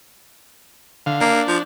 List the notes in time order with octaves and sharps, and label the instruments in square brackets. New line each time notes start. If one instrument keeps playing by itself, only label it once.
[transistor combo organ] D3 F5
[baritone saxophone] A#3 [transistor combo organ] D4
[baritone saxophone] F3